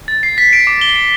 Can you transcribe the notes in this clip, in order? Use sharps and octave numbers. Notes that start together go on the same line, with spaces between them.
A6
C7
B6
D7
D6
G7
D7